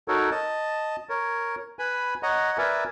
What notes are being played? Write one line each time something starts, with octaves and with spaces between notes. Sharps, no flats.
D#4 F#4 A4 A#4 C#5
D#5 A5
A#4 C#5
B4 G#5 B5
C#5 D#5 F#5 A#5
A#4 B4 D5 E5 G#5